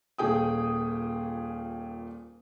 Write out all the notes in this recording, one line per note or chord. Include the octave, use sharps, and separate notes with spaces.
D#1 A#2 G#4 G5 D#6